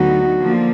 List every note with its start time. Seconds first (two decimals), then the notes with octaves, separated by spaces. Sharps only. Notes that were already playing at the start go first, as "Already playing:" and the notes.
Already playing: D2 D3 F#3 B3 D#4 F#4
0.40 D3 F3 A#3